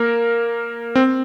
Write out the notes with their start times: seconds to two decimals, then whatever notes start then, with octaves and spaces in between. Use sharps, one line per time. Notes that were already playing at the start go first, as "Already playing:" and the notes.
Already playing: A#3 A#4
0.95 C4